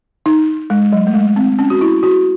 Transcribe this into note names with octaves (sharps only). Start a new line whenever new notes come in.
D#4
G#3
F#3
A3
G#3
C4
C#4
F#4
E4
F#4